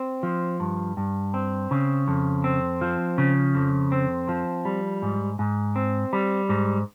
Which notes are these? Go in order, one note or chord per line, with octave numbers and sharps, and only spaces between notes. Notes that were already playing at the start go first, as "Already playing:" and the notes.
Already playing: C4
F3
G2
G2
C4
C#3
F2
C4
F3
C#3
F2
C4
F3
G3
G#2
G#2
C4
G3
G#2